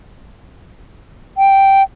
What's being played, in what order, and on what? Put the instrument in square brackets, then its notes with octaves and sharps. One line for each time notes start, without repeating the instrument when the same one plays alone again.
[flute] G5